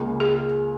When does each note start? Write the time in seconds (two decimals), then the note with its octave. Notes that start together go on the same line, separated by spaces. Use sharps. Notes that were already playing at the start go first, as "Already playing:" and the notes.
Already playing: C#2 C#3 A#3
0.20 G#4